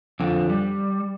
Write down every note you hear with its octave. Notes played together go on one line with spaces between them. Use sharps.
F2 D3 F3
G3